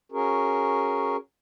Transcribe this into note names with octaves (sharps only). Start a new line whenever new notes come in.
C#4 F#4 G#4 A#4